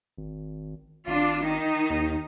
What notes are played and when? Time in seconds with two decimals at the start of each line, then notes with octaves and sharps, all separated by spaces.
0.18 G#1
1.07 G#1 D4 F4
1.43 D#3 D#4
1.90 D#2